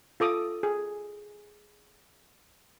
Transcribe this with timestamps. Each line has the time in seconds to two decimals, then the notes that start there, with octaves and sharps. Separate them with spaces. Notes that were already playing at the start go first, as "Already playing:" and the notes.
0.20 F4 A4 D6 D#6
0.63 G#4